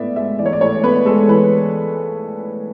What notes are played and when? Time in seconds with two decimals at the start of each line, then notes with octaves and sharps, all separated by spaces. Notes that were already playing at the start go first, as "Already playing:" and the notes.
Already playing: A2 B3 D5 E5
0.16 G#3 E5
0.39 E3 D5
0.46 C#5
0.53 D5
0.61 A2 C#5
0.83 B3 B4
1.06 G#3 A4
1.28 E3 B4